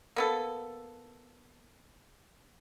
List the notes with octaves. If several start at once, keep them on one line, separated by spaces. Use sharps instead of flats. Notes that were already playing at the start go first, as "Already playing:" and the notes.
A#3 B3 A4